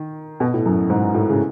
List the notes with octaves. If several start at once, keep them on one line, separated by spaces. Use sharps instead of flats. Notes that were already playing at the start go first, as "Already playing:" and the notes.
Already playing: D#3
B2
A2
F#2
G#2
A2
C#3